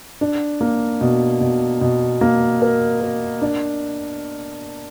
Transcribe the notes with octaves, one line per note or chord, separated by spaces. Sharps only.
D4
A#3
B2
B2
B2
A#3
A#4
A#4
D4